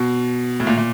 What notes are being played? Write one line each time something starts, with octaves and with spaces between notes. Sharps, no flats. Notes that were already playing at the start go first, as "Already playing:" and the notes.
Already playing: B2
A2
A#2
A#2